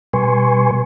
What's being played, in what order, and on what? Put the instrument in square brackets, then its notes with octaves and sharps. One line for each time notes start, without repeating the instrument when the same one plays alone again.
[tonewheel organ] B2 G3 B4 G#5 C6 C#6